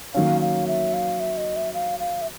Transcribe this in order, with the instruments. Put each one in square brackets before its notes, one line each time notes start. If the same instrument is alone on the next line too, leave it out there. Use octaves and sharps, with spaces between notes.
[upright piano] D#3 F#3 A#3 C#4 [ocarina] F5
[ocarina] F5
E5
F5
E5
D#5
E5
F5
F5
E5